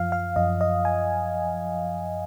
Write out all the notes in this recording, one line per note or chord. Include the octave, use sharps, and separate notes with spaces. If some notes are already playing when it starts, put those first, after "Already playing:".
Already playing: F#2 F3 F5
F5
F#2 F3 D#5
D#5
G#5